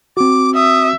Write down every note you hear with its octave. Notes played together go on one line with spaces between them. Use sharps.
C4 F#4 D6
E5 D#6